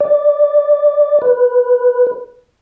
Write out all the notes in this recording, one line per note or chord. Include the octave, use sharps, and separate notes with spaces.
D5
B4